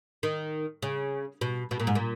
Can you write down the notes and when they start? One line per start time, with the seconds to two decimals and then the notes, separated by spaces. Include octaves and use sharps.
0.23 D#3
0.82 C#3
1.41 B2
1.71 B2
1.80 A#2
1.87 G#2
1.95 A#2